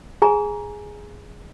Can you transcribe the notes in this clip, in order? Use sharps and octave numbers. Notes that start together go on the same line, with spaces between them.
G#4 G#5 A#5